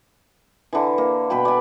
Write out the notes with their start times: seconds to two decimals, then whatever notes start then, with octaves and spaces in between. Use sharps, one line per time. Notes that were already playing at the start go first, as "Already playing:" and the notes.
0.73 D3 E3
0.98 A#3
1.30 B2 B4 G5 B5
1.45 D5 G#5